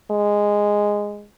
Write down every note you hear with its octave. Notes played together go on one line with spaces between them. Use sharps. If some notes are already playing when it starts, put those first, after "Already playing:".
G#3